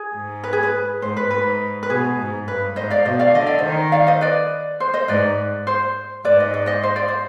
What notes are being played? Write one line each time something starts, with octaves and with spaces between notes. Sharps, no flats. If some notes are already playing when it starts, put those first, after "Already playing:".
Already playing: G#4
G#2
B4
G#4
B4
G#2 C5
B4
G#2 B4
B4
B2 G#4
G#2
G2 B4
G#2 C5 D#5
D5 F5
B2 C5 D#5
D5 F5
D3 D#5
D5
D#3 C5 D#5
D5 F5
C5 D#5
B4 D5
C5
C5 D#5
G#2 B4 D5
C5
G#2 B4 D5
D#5
D5
C5 D#5
C5
D5
C5